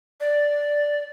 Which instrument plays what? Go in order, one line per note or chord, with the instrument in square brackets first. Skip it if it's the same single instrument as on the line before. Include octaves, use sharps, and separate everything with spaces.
[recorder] D5